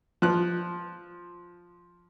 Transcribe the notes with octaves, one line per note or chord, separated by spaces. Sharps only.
F3 F#6